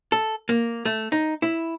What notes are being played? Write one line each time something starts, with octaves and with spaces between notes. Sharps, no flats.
A4
A#3
A3
D#4
E4